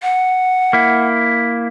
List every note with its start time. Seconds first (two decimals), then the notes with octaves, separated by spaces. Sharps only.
0.03 F#5
0.73 A#3 E4